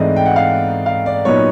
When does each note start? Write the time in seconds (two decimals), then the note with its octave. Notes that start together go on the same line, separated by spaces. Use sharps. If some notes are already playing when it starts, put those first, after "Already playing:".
Already playing: G#2 E3 A3 C4 D#4 D5 D#5
0.16 G5
0.26 F#5
0.36 F5
0.86 F5
1.06 D5
1.25 A#2 F#3 B3 D#4 C#5